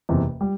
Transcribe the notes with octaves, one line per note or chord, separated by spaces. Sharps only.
F#1 E2 C3
G3